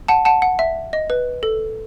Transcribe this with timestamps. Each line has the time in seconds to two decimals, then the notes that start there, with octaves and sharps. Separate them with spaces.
0.08 F#5 A5
0.25 F#5 A5
0.42 F#5
0.59 E5
0.93 D#5
1.10 B4
1.43 A4